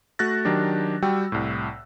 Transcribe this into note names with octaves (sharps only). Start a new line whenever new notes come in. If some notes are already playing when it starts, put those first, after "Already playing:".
A3 F#4 F#6 A6 A#6
D#3 F#3 D4 G4
G3 F#4 G5 E6
C2 A2